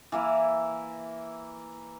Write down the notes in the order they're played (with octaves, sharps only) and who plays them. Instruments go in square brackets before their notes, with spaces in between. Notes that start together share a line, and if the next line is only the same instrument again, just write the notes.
[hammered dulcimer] E3 A#3 E4